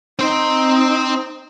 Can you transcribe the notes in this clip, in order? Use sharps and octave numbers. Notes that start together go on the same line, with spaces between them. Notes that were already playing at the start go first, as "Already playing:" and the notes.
C4 D#4 C5